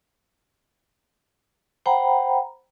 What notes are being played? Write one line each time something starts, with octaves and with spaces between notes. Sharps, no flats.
C5 F#5 G5 A#5 B5